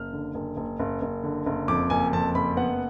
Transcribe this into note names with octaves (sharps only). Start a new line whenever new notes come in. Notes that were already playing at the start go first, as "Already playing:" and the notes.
Already playing: F#1 F6
D3
F#1
F#1
F#1
F#1
D3
F#1
F2 D6
F#1 G#5
F2 A5
F#1 B5
B3 F#5